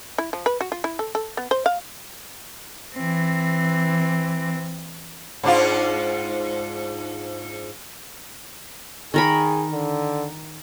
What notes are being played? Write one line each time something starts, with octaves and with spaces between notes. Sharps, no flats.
E4
F3
B4
F#4
F4
E4
A4
A4
B3
C5
F5
E3 C4
G#2 D4 F4
D#3 G#4 A#4 B5
D3